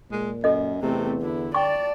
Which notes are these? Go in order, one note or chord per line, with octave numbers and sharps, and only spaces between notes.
A#2 G#3
F#2 A4 D#5
E2 C3 A3 C4
D3 E4
D5 G5 A5 C#6